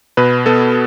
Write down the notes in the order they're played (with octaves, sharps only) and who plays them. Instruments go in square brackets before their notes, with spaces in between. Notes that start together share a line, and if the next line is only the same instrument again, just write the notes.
[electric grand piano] B2 B4
B3 A4